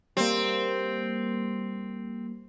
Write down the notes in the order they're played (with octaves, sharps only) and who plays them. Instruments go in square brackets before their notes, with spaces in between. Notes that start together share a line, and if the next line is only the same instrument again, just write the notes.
[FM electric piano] G3 A#3 [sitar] C4